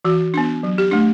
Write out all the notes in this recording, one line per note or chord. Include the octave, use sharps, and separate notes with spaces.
E3 F#4
B3 D4
F#3
G4
A3 D4